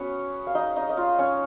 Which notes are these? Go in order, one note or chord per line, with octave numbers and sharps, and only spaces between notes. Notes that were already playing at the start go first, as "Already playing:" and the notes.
Already playing: B3 C#4 F#4 G#4 B4 C#5
F5
D#4 D#5
D#4 D#5
D#5
F4 F5
C#4 C#5